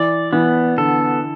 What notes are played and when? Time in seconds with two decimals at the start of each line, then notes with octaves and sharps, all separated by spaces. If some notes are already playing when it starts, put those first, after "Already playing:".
Already playing: E3 D5
0.32 E3 B3
0.78 D3 A4